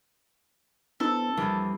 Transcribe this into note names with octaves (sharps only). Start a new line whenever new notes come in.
B3 C4 D4 E4 A4 E6
F2 E3 G3 A#3